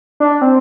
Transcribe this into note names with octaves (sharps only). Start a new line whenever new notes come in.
D4
C4